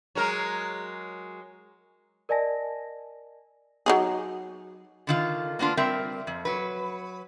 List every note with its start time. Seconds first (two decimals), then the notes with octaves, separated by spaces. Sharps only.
0.15 F#3 G#3 A#4
2.29 A#4 D5 D#5 G#5 A5 A#6
3.86 F#3 D#4 G#4
5.07 D3 D#3 F4
5.59 A#3 B3 D4 F4
5.77 G3 C4 A#4 E5
6.27 F2
6.45 F#3 B4